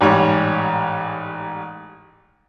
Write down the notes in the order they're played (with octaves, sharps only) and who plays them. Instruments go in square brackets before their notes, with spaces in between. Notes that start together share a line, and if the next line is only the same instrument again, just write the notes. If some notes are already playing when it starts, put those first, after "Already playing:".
[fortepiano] A1 G#2 G3 G4 C#5 D6